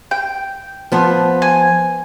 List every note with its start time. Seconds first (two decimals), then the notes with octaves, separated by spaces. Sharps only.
0.11 G5
0.92 F3 B3 A5
1.42 G#5